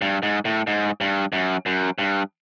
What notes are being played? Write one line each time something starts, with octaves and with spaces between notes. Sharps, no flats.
G2
G#2
A2
G#2
G2
F#2
F#2
G2